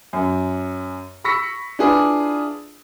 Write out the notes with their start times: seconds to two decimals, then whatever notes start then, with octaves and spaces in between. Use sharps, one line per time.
0.13 F#2
1.24 B5 C#6 E6 A#6 B6 C#7
1.79 D4 E4 F4 G#4 B4